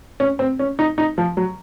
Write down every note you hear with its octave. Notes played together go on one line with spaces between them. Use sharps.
C#4
C4
C#4
D#4
D#4
F3
F#3